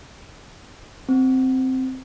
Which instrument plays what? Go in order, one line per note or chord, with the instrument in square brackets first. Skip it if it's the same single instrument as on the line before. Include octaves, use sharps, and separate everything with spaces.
[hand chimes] C4